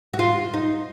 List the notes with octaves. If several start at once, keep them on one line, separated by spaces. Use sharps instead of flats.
F#4
F4
D#4